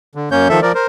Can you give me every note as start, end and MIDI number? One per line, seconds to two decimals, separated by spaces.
0.15 0.29 50
0.31 0.48 42
0.31 0.48 58
0.31 0.48 61
0.31 0.48 73
0.31 0.48 91
0.49 0.60 51
0.49 0.60 53
0.49 0.60 69
0.49 0.60 76
0.62 0.72 53
0.62 0.72 70
0.62 0.72 74
0.75 0.87 70
0.75 0.87 72